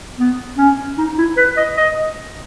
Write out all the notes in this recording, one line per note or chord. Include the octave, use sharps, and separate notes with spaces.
B3
C#4
D#4
E4
B4
D#5
D#5